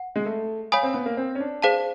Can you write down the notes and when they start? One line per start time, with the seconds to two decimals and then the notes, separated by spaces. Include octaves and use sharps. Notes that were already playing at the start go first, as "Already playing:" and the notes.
Already playing: F#5
0.16 G#3
0.26 A3
0.72 C#5 F5 G#5 B5 D#6
0.83 C4
0.94 B3
1.06 A#3
1.17 C4
1.35 C#4
1.40 D4
1.62 G#4 C5 F5 A5